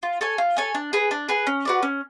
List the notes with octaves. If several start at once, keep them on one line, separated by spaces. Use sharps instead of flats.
F4
A4 C#5 G#5
F4
A4 C#5 G#5
D4
G#4 B4
D4
G#4 B4
C#4
F#4 B4 D5
C#4